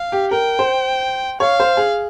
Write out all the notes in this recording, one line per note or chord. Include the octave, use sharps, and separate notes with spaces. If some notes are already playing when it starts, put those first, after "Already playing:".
Already playing: F5
G4
A#4 G5
C5
C#5 F5
C5
G#4